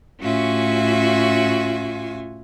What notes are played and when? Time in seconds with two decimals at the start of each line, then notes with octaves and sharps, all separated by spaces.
0.21 A2 C#4 F4 F#4 E5 G#5